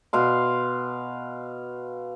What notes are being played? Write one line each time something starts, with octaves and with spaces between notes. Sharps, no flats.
B2 F5 C6